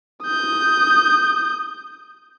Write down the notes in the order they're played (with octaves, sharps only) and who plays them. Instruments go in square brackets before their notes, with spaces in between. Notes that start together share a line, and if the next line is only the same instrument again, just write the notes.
[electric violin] D#6 G6